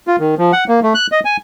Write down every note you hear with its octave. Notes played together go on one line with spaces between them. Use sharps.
F4
D#3
F3
F#5
A#3
A3
F#6
D#5
G#5